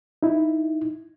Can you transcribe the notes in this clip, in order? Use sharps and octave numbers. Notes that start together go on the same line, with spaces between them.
D#4 E4